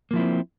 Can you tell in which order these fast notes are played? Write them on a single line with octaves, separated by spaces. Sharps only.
A#3 F3 E4 C4